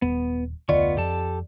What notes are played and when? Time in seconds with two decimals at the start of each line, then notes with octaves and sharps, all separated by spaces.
0.02 D#1 B3
0.69 F1 D2 D3 B3 F4 D5 D#5 C#6
0.97 F2 F3 G4 A4 A5